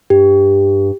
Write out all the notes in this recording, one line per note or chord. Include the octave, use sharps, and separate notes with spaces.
G2 G4